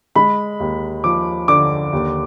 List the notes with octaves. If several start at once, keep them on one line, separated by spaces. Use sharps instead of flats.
G#3 B5
D#2
F3 D6
D3 D6
D#2